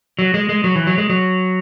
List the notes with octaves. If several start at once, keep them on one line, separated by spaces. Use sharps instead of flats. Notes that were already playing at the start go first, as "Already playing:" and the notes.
F#3
G#3
G#3
F#3
E3
F#3
G#3
F#3